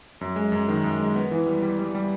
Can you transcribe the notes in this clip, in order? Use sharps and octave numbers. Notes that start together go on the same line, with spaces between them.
F#2
G#3
F#2
D#3
F#2
G#3
B3
E3
G3
G3
G3
G3